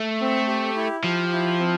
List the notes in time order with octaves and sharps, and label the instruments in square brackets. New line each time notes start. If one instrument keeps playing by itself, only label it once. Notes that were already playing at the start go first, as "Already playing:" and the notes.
Already playing: [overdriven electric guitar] A3
[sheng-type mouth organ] C4
G4
E4
[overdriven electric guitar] F3 [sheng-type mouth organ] G4
[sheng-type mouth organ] E4
C4